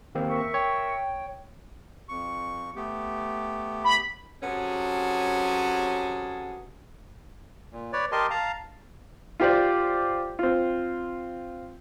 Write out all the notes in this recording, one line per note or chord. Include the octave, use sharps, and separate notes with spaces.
D#2 A#3 C4
A#4 E5 C#6
C#5 G5
F2 C#6
A3 B3 G4
B5
C3 F#3 B3 C#4 G#4 A4
A#2
B4 C#5 D5
G4 A#4 D#5 A5 C6
F5 A5 A#5
F4 G4 C5 D5
C4 F4